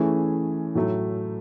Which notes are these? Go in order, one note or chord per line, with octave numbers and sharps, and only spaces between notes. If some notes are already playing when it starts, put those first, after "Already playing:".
Already playing: E3 A3 C#4 G#4
A2 F#3 A3